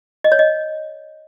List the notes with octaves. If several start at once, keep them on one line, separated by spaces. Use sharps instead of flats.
D#5
C#5
D#5